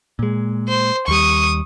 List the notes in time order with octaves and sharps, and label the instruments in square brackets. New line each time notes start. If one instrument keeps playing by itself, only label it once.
[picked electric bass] A#2 G#3
[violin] C5
[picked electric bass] D#2 G3 [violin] C#6 D#6